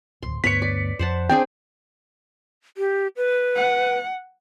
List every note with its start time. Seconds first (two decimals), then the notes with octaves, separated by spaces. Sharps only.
0.23 D1 G#1 C6
0.44 D2 G2 B3 B4 C#5 B6 C#7
0.62 D5
0.99 F2 C5 F#5 A5
1.29 C4 D4 G#4 G5
2.77 G4
3.17 B4
3.56 F#5